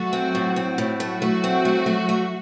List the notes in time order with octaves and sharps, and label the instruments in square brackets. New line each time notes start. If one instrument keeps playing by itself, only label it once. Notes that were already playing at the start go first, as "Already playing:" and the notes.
Already playing: [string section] F#3 F#4 [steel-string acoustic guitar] A3
[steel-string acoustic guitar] C4
A2
C4
A2
[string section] F#3 F#4 [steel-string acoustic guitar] A3
[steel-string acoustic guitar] A3
C4
A3
A3
A3